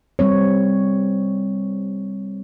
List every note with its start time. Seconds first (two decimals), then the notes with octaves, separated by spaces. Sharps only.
0.19 G3 C4 C#5